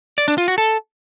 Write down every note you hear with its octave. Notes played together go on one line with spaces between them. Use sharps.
D5
D4
F4
F#4
A4